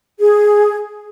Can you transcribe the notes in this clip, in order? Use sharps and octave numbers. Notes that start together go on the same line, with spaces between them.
G#4